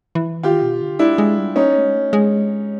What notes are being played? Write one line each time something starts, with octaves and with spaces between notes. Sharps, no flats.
E3
D#3 F4 G4
B2
D3
G#3 D4 E4
G#3
G3
A#3 C#4 D#4
A3
G#3
A3
G#3